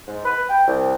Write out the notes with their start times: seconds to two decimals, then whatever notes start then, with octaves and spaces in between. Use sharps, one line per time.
0.07 G#2
0.25 B4
0.49 G5
0.67 C2